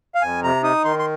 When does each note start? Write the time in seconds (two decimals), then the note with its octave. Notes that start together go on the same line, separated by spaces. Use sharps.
0.15 F5
0.22 F2 G#5
0.43 C3 A#5
0.63 D#4 D#6
0.85 D#3 C6
0.99 C6